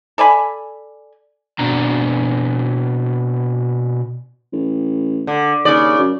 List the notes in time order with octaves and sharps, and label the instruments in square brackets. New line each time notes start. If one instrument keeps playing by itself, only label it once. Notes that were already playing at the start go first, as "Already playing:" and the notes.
[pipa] A4 D5 G#5 B5
[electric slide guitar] B2 C4 D4 A#5
[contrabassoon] A1
[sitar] D3
[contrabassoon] D#2 [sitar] C#3 D5
[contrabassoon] F#2